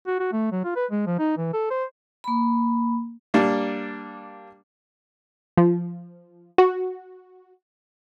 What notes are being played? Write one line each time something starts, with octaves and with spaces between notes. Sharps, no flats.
F#4
F#4
A3
F#3
F4
B4
G#3
F3
D#4
E3
A4
C5
A#3 B5
G3 A#3 D4
F3
F#4